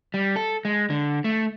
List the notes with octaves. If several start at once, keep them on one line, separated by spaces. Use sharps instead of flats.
G3
A4
G#3
D3
A3